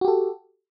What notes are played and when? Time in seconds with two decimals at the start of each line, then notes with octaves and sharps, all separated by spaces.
0.01 F#4
0.05 G4
0.08 A4